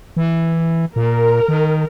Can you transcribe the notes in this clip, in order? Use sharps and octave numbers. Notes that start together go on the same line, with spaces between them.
E3
A#2 A#4
D#3